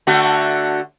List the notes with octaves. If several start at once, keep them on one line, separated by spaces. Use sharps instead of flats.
D3 A3 F#4